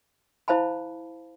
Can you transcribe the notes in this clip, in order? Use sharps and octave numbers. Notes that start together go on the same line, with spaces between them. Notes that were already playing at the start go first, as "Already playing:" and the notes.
E4 C5 F5 A5 B5